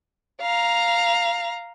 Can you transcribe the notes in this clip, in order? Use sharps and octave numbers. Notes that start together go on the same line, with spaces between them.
F5 A#5